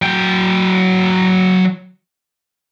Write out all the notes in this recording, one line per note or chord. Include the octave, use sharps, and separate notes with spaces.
F#3 G5